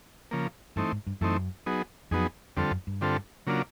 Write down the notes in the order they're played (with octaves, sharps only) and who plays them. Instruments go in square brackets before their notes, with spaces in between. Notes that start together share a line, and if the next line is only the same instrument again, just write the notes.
[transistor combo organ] C#3 F3 A#3
[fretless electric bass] G2 [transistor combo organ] E3 A3 C4 D#4
[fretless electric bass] G#2
G2
[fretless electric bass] F#2 [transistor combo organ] E3 A3 C4 D#4
[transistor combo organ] F#3 B3 D#4 G#4
[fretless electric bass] F2 [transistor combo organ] F#3 B3 D#4 G#4
[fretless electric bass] F2 [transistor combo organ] D3 G3 C4 F4 A4
[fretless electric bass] F#2
G2
[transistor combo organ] D3 G3 C4 F4 A4
C#3 F#3 A#3 D4 F4